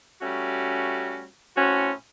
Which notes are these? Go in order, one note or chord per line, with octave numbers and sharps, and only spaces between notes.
G3 A3 C#4 F#4
A2 C4 C#4 F#4